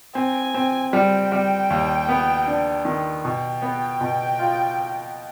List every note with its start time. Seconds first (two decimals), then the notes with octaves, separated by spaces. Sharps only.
0.15 C4 G#5
0.54 C4
0.93 G3 G5
1.32 G3
1.70 D#2
2.09 B3
2.48 D4
2.85 D#3
3.25 B2 G5
3.62 B3
4.01 B2
4.39 F4